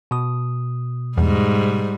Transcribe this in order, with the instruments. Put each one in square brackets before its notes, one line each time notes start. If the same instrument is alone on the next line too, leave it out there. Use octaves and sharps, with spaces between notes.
[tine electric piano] B2 D#6
[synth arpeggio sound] E2 [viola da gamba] G#2 G3